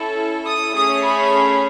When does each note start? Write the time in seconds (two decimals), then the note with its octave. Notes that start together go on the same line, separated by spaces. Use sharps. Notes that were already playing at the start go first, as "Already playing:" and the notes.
Already playing: C#4 E4 A4
0.47 D#6
0.75 A3 C#4 G#4 D#6
1.05 B5